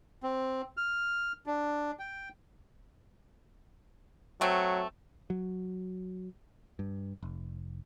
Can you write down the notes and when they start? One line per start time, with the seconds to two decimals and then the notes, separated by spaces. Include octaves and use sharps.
0.23 C4
0.77 F6
1.46 D4
1.99 G5
4.41 F#3 A3 C4
5.30 F#3
6.79 G2
7.23 F1